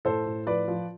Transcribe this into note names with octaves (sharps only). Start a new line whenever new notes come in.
A2 A4 C5
A2
F3 B4 D5
F3